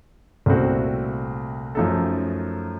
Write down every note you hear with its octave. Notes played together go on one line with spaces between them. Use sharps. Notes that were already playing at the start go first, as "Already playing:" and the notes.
C2 A#2 A3 C4 F#4
F#2 F3 A3 D#4 A4